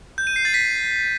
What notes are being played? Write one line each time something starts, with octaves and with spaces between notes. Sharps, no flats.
G6
D#7
C7
A6
B6